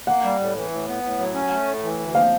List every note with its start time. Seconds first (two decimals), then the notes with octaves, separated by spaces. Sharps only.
0.07 A#3 F#5
0.24 G3
0.40 A2
0.56 E3
0.71 A2
0.87 B3
1.04 A2
1.19 F#3
1.35 C#4
1.51 A3
1.67 A2
1.84 E3
1.99 D2
2.14 F3 F5